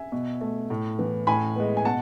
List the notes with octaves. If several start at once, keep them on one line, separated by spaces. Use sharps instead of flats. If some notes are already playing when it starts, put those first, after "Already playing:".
Already playing: E5 G#5
B2
A3
A2
E3 B3
A2 G#5 B5
G#3 B3
G#5
B2 F#5 A5